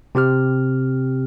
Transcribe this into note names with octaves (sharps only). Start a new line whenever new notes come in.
C3 C4 G4 F6